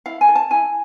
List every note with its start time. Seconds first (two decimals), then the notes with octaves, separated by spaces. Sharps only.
0.06 E4 F5
0.21 G#5
0.28 A4
0.35 A5
0.51 E4 G#5